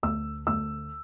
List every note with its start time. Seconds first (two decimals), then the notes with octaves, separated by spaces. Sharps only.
0.03 D2 E6
0.47 D2 E6